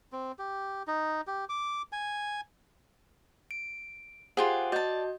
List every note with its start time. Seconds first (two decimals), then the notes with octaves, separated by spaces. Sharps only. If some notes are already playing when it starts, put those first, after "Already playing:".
0.12 C4
0.39 G4
0.87 D#4
1.27 G4
1.49 D6
1.92 G#5
3.51 D7
4.37 F4 G4 G#4 C5 F#5
4.72 F#4 D5 D#5 A5 G6